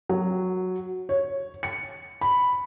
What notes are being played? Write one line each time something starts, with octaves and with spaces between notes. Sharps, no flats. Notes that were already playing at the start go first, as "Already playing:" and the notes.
F#3
C#5
C#7
B5